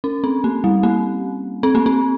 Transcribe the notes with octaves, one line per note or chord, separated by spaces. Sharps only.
C#4
C4
A#3
G3
A#3
C4
A#3
C4